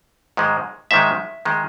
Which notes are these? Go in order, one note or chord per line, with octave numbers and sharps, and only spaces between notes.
G#2 D#3 G#3
G#2 D#3 G#3 E5
D#3 G#3